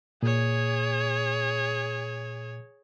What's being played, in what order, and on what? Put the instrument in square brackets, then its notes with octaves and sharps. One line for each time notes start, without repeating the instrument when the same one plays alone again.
[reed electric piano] A#2 [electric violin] G#4 C#5